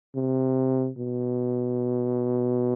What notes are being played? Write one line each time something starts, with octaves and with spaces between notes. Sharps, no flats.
C3
B2